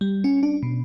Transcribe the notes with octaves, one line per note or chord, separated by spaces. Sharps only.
G3
C#4
D4
B2